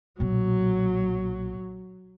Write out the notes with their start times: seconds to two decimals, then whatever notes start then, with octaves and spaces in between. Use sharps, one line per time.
0.20 B1 A#2 F#3